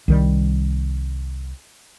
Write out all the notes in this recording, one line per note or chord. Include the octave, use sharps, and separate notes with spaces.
C2 D#3 G3